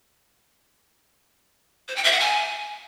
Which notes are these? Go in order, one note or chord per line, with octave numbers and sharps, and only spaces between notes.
C5
G5
E5
F#5
G#5